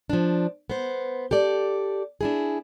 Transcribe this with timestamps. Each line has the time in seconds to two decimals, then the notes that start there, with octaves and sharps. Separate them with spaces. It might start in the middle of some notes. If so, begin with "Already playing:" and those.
0.10 F3 D4
0.70 B3 C5
1.31 G4 A4 D5
2.21 D4 E4 G#4